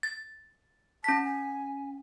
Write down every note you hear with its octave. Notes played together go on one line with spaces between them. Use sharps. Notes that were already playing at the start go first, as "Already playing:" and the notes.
A6
C#4 A5 B6
G#5